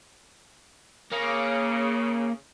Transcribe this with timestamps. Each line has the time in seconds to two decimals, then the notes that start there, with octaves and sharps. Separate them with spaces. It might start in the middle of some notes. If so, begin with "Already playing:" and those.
1.12 C#3 A#3